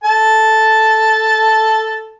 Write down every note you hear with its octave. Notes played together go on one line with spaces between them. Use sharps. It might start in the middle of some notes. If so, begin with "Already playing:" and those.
A4 A5